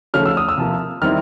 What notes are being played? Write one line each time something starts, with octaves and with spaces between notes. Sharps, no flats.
C#3 F3 A3 C#4 F6
E6
D#6
E6
C3 F3 A#3
D#3 G3 C4 E4 F6